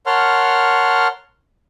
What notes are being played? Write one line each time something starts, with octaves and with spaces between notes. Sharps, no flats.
A#4 C#5 F#5 A5 C6 F6